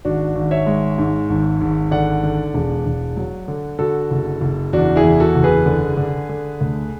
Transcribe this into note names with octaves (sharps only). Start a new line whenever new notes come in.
G#1 D4 F#4
G#1
C#5 E5
G#3
G#2
G#1
G#1
D3 D5 F#5
D3
E1
E1
F#3
D3
D3 F#4 A4
F#1
F#1
E2 D4 F#4
E4 G#4
E2
F#4 A4
F#1
G#4 B4
D3
D3
D3
D2